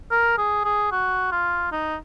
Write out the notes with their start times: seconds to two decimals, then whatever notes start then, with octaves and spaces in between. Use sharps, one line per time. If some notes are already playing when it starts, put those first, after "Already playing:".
0.12 A#4
0.38 G#4
0.65 G#4
0.92 F#4
1.32 F4
1.72 D#4